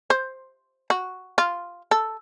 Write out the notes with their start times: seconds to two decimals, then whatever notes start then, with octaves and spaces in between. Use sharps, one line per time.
0.10 C5
0.90 F#4
1.38 F4
1.91 A4